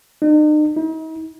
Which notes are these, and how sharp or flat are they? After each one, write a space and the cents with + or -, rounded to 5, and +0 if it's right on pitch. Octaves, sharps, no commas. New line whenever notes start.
D#4 -45
D#4 +40